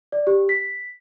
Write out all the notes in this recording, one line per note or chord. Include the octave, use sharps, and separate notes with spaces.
D5
G4
B6